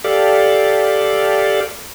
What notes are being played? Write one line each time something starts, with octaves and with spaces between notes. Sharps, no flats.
G4 A4 D5 F5